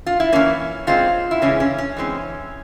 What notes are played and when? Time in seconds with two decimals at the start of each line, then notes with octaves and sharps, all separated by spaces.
0.06 F4
0.20 E4
0.32 E3 A#3 C#4
0.87 A#2 G#3 C4 F4
1.31 E4
1.42 C#3 E3 G#3 C#4
1.60 C#4
1.78 C#4
1.97 E3 G#3 C4